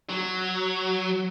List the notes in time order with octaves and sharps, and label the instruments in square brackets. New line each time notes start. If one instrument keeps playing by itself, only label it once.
[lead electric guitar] F#3